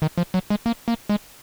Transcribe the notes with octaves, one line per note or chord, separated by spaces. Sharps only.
D#3
F3
F#3
G#3
A#3
A#3
G#3